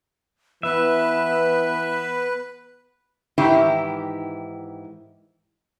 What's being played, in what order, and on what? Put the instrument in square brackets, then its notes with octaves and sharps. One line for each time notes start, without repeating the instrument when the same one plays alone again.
[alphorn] E3 [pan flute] B3 [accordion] B4 [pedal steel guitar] E5
[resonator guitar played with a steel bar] G#2 D#3 E3 E4 G4